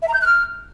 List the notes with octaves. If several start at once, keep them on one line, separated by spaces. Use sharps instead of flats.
E5
A#5
G6
F#6
F6